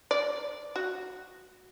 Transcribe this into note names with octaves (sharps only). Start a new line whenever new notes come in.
D5
F#4